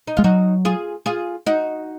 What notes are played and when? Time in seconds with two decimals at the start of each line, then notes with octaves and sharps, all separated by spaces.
0.07 D#4
0.17 G#3 F4
0.24 F#3 D#4 F#4
0.65 F4 G#4
1.06 F4 G#4
1.46 D#4 F#4